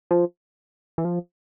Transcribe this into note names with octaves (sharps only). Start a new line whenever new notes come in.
F3
E3
F3